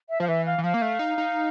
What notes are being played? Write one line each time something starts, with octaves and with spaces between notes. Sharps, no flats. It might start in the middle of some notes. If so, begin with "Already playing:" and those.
E5
F3 F5
E3 E5
F5
E3
F3 F5
A#3
A3
D#4
D#4